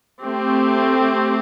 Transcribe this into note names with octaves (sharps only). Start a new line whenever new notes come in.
A3 C4 G4